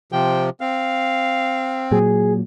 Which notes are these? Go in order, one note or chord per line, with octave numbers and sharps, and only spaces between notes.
C3 F3 G5
C4 F5
A#2 F#3 G#4